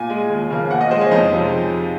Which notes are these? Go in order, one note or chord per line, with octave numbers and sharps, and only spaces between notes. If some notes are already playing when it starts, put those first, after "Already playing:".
Already playing: A#2 G#5
G#3
D#2
C#3 F3 A#3
A#2 F#5
D#5
G#3 C5
C#4
F2 D#4
C3 F3 G#3